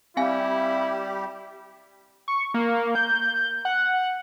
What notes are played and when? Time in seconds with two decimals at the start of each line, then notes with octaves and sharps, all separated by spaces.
0.17 G3 C4 E4 G4 F5 G#5
2.28 C#6
2.54 A#3
2.95 G6
3.65 F#5